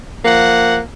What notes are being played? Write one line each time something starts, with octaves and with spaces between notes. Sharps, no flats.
F3 A#3 F#5